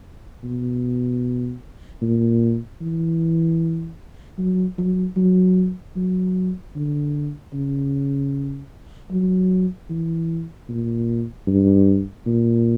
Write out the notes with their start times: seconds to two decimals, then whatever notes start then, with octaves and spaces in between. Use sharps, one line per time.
0.44 B2
2.02 A#2
2.81 E3
4.38 F#3
4.78 F#3
5.16 F#3
5.96 F#3
6.75 D3
7.53 C#3
9.11 F#3
9.89 E3
10.69 A#2
11.47 G2
12.26 A#2